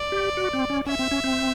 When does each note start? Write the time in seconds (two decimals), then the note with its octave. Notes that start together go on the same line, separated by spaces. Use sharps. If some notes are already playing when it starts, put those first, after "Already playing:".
Already playing: D5
0.12 G4
0.37 F#4
0.53 C4
0.70 C#4
0.86 C#4 E5
0.99 C4
1.11 C#4
1.24 C4